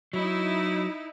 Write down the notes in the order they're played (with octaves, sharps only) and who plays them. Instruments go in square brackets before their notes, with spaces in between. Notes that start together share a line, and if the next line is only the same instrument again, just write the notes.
[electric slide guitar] F#3 [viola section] D#4 E4